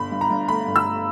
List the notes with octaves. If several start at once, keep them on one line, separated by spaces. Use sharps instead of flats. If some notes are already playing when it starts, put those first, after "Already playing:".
Already playing: G1 B5
G2
A#5
G2
A3 B5
G2
E6
A3